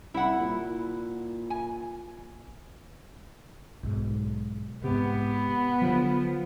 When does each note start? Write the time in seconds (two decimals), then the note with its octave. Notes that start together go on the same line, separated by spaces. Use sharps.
0.14 C2 E4 F#5
0.39 A#2
1.50 G#5
3.83 B1 G#2
4.84 G#2 C3 B3 G4
5.82 D3 F3 F#3